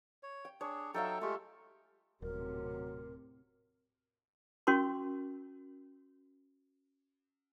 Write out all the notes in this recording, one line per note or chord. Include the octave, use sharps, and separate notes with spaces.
C#5
G5
D4 G#4 C#5
F#3 D#4 A4 E5 F5 G5
G#3 A3 F4 G4 A4
D#1 A2 C3 F#3 A#4
C#4 F#4 A#4 C6 C#6